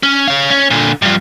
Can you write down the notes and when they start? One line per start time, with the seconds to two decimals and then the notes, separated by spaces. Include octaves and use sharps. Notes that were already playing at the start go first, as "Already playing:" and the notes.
0.03 C#4
0.28 C#5 F5
0.50 C#4
0.70 A#2 D3
1.02 G2 F3